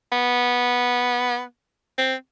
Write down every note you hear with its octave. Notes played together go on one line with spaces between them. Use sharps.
B3
C4